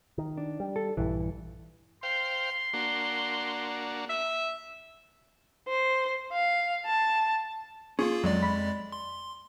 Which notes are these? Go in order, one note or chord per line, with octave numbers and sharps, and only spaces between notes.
D#3
D4
G3
A4
A#1 G2 E3
C5 F5 G5 C6
A#3 D4 F#4
E5
C5
F5
A5
A#3 C#4 F4 G#4
F2 F#3 G#3 D5
B5
C6